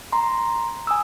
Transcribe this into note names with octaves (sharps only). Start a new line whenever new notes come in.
A#5 C6
G#5 D#6 E6